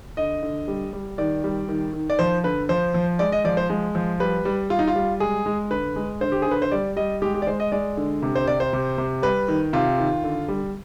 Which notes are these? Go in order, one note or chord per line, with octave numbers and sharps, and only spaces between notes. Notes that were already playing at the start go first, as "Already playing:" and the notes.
D3 D#5
D3
G3
G3
D#3 D5
G3
D#3
D#3
D5
F3 C5
D3 B4
F3 C5
F3
G#3 D5
D#5
F3 D5
C5
G#3
F3
G3 B4
G3
G3 F4
D#4
F4
G3
G#3 G#4
G#3
D3 B4
G#3
D3 C5
G4
D3 G#4
B4
C5
G3 D5
G3 D#5
G#3 G4
G4
D5
G#3 C5
D#5
G#3 D5
D3
C3
C5
C3 D5
C5
C3
C3
G3 B4
D#3
C3 F4
D#3
D3
G3